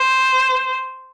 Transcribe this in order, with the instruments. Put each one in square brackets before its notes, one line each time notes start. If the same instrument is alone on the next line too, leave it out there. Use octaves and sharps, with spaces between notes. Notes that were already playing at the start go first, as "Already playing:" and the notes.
Already playing: [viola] C5